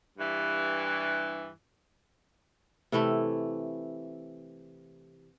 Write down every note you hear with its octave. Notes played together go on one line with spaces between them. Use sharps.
G2 E3
C3 E3 A3 E4